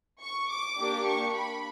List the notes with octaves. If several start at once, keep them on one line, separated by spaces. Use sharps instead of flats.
C#6
D6
A#3 D4 G4
C#6
B5